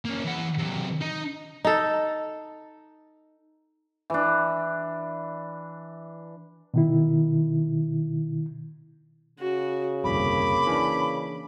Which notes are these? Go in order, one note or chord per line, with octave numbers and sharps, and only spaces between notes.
A#3 C#4
E3 F#5
C3 F#3
D#4
D#4 A4
E3 D4
B2 D#3 E4
C#3 F#4
G1 C2 F2 A#3 B5 D6
E3 C#4 D4